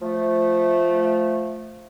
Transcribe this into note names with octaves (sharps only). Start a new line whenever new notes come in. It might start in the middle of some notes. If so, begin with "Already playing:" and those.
F3 A3